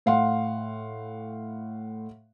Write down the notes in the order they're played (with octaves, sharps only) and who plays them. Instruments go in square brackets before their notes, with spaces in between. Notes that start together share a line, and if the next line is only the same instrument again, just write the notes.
[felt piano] A2 F5 F#5 C6